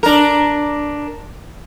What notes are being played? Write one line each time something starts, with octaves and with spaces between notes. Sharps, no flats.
D4 A#4